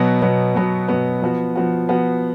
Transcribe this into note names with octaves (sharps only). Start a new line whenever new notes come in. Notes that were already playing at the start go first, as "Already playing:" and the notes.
Already playing: B2 F#3 B3
B2 F#3 B3
B2 F#3 B3
B2 F#3 B3
F3 B3 F#4
F3 B3 F#4
F3 B3 F#4